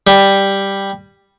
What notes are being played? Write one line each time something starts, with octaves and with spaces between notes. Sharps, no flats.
G3